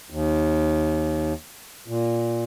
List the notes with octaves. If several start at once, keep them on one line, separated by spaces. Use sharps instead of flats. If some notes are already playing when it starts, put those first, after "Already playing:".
D#2
A#2